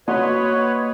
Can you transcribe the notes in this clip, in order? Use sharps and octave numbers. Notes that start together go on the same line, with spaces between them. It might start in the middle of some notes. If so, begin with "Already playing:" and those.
A#3 F#4 B4 C#5 D#5 C6